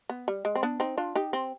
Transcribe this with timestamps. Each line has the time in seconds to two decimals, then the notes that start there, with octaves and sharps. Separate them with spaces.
0.09 B3
0.28 G3
0.45 G#3
0.55 C4
0.63 B3 D4
0.80 C4 D#4
0.98 D4 F4
1.15 D#4 G4
1.33 C4